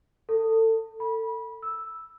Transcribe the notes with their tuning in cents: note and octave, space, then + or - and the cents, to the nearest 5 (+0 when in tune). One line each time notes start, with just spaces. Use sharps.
A4 +25
B5 -25
E6 -5